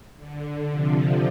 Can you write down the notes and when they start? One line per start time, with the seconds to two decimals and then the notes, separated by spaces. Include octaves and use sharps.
0.17 D3
0.69 C3 F3